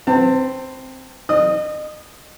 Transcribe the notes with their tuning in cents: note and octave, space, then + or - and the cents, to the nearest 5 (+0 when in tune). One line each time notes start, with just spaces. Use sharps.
C4 +0 B4 +30 A5 +35
D#5 -35 D#6 +0